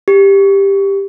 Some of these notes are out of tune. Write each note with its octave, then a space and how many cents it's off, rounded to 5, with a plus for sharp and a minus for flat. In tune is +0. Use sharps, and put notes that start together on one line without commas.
G4 +10